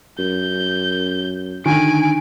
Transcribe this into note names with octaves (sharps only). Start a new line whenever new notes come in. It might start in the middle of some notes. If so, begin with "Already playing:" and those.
F#2 G6
D3 D#3 G#5 D7